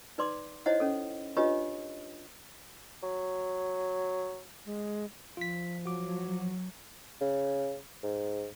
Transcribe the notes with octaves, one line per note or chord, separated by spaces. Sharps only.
D#4 B4 D5 C6 D6
D#4 E4 C5 C#5 D#5 F#5
C#4 A4
D4 F4 G4 B4 C#5 D#5
F#3
G#3
F3 F4 B6
F#3 F#4 D6
C#3
G#2